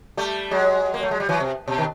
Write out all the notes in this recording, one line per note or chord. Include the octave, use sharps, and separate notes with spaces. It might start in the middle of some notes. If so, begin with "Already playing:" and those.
G3 A3
F#3 G#3
A#3
A3
G#3
G3
E3 F#3
C3
B2
D#3